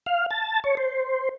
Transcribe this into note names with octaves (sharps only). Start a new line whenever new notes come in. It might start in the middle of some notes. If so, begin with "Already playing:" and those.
F5
A5
C#5
C5